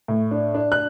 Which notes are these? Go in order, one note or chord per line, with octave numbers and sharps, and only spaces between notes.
A2
D4
D4
F#6